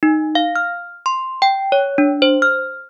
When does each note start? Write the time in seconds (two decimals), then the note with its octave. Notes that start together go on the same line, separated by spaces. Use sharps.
0.03 D#4
0.35 F5
0.56 F6
1.06 C6
1.42 G5
1.72 C#5
1.98 D4
2.22 C5
2.42 F6